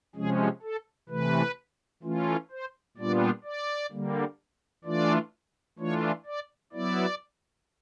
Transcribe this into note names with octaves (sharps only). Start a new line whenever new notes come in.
C3 F3 G#3 C#4 G#4
A4
C3 E3 A3 B4
E3 A3 C#4 F4
C5
A#2 G3 B3 D4 F4 D5
D5
D3 G3 A#3
E3 A3 D4 F4 D5
E3 A3 D4 F4 C#5
D5
F#3 B3 E4 D5